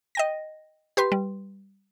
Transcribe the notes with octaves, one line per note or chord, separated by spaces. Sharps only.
D#5 G5 A#6
G4 B4 C6
G3